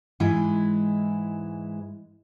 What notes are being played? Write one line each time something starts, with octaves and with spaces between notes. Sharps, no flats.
G#2 E3 G#3 E4